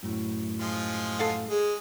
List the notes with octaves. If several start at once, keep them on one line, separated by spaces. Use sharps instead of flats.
F#2 A2
F3 G#3 F4
A4 F5 F#5
G#3 G#4